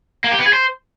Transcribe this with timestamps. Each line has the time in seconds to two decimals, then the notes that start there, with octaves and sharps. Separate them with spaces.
0.24 A#3
0.31 G4
0.39 B3
0.46 G#4
0.53 C5